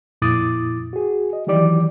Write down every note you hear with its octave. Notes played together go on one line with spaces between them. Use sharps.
F2 A#2 E4 D6 D#6 A6
F#4 G#4
D#5
D#3 E3 F#3 G4 D5 D6